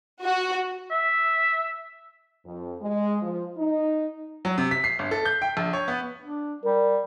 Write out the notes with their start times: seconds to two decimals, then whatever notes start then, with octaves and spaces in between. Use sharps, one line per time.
0.23 F#4
0.91 E5
2.46 F2
2.82 G#3
3.23 F3
3.58 D#4
4.45 F#3
4.58 C3
4.71 B6
4.84 C7
4.99 G1
5.11 A4
5.25 G6
5.42 G5
5.57 A#1
5.73 C#5
5.88 B3
6.21 D4
6.64 G3 A#4